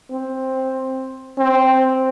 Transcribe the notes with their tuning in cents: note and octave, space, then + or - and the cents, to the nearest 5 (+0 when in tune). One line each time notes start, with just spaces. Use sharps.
C4 +10
C4 +0